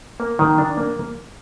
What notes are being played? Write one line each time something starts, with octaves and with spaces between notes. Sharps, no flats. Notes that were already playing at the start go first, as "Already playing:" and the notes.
A#3
D#3
D4
A#3